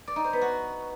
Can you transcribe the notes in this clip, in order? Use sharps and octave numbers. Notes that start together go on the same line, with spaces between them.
D5
D#4
C5
B3
F#4